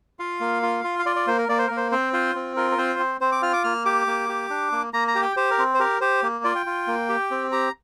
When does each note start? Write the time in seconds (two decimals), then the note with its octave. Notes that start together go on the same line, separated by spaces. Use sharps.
0.19 F4 F5
0.40 A#3
0.62 F4
0.84 F4
0.99 F5
1.06 F4 D5
1.16 D5
1.27 A#3 C5
1.38 A#4
1.49 A#3 D5
1.59 C5
1.67 A#3 A#4
1.77 C5
1.92 C4 C5
2.13 F4 C5
2.35 C4
2.56 F4 A#4
2.71 A#4
2.78 C4 C5
2.99 C4
3.21 C4 C5
3.32 D6
3.42 F4 F6
3.53 D6
3.64 A#3 F6
3.85 G4 D6
4.07 A#3
4.29 G4
4.50 D4
4.72 A#3
4.93 A#3 A#5
5.08 A#5
5.15 G4
5.22 G5
5.36 G4 C5
5.51 A#4
5.58 C4
5.74 C5
5.80 G4 A#4
6.01 G4 C5
6.23 A#3
6.44 F4 D5
6.55 G5
6.66 F4
6.88 A#3
7.09 G4
7.31 C4
7.52 G4 A#5